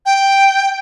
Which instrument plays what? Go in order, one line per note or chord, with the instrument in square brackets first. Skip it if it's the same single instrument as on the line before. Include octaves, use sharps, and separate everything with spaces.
[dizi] G5